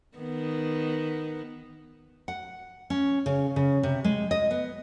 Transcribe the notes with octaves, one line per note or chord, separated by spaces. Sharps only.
D#3 B3
F#5
C#4
C#3
C#3
C3
G#3
D#5
B3